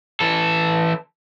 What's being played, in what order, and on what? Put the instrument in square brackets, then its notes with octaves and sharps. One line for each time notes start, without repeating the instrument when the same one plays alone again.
[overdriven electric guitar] E3 A4